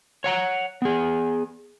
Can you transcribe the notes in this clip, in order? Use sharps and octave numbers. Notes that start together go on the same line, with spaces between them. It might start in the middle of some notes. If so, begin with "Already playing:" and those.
C#5 F#5 A#5
B3 G#4